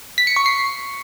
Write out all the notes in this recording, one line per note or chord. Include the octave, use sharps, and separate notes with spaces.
B6
C#7
C#6
C7